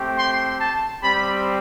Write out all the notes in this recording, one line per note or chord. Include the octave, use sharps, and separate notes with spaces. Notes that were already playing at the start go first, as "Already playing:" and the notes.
Already playing: A3 C4 G4
C6
A5
G3 C4 G4 B5